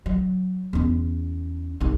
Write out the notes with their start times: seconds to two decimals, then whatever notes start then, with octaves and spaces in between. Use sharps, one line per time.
0.06 F#3
0.73 E2 C#4
1.80 C2 D#4